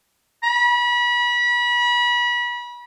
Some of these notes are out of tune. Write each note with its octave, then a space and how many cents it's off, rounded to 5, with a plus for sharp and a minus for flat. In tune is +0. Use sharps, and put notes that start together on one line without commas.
B5 -35